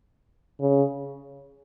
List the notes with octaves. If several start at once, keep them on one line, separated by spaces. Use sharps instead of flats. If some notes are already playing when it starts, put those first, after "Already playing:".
C#3